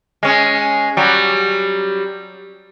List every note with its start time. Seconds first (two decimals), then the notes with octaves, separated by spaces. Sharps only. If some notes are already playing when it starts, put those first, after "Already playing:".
0.23 G#3 C#4
0.97 F#3 G3